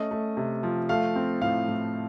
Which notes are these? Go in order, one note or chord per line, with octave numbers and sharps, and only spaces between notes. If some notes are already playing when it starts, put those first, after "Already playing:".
Already playing: A3 C#4 D#5
A3
C3
F3
A3 F5
C4
A2 F5
A2